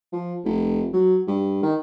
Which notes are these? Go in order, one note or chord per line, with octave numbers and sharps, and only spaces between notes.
F3
F1
F#3
G2
D#3